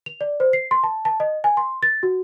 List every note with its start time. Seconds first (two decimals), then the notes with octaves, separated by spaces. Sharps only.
0.06 F7
0.21 D5
0.40 C5
0.53 C7
0.71 C6
0.83 A5
1.05 A5
1.20 D#5
1.44 G#5
1.57 C6
1.83 A6
2.03 F#4